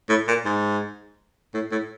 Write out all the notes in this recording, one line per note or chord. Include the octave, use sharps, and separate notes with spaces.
A2
A#2
G#2
A2
A2